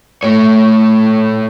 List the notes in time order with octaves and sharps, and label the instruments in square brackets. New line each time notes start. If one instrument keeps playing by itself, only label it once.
[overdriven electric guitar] A3 C#5